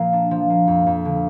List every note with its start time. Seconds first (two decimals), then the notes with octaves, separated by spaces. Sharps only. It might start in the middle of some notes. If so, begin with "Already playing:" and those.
Already playing: A#2 F3 A#3
0.13 D4
0.31 F3
0.50 A#3
0.67 F2
0.86 F2
1.05 D3